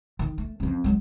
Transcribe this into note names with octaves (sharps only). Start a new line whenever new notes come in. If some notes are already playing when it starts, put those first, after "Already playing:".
D#3
A3
F2 C#4
F#3 G#3